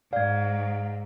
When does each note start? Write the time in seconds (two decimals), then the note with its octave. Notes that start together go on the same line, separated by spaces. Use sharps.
0.13 G#2 D5 F5 G#6